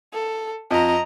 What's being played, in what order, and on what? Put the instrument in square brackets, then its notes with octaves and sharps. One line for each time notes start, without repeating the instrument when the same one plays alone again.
[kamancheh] A4
[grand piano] F2 [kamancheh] D#5 A#5